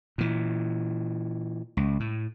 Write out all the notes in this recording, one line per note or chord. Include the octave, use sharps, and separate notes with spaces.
A#2 E3
C#2
A2